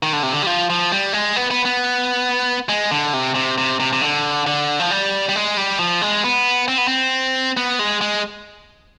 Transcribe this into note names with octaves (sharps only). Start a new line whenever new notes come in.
D#3
D3
C3
D3
G3
F3
F3
G3
G#3
B3
B3
B3
G#3
D3
C3
C3
C3
C3
C3
D3
D3
F3
G3
G3
G#3
G3
F3
G#3
B3
C4
B3
C4
B3
G#3
G#3